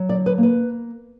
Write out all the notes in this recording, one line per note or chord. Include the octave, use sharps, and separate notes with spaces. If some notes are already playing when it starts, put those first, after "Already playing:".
Already playing: F#3
D5
D3
B4
A#3
B4